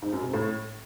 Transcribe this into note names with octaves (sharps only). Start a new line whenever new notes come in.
G#2
F#2
C3
A2